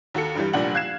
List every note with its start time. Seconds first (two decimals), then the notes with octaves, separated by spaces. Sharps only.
0.14 D#2 F#4 A4 C#7
0.35 G2 E3 G3
0.53 F1 A#2 G3 D4 F#5 F#7
0.74 F5 F#6 G#6 C7 E7